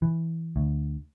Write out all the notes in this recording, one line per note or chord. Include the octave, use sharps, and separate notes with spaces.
E3
D2